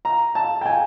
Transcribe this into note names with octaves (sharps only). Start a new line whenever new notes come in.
A#5
A5
G5
G#5